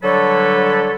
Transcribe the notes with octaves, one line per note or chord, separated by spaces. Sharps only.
D3 F#3 G3 A4 B4 C#5